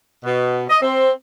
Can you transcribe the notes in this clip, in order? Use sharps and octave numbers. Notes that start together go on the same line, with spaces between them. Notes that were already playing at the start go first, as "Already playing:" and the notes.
B2
D#5
C4